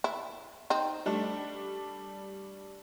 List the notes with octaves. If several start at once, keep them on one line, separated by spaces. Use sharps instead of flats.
E4
C4 D#4
G3 A3 D4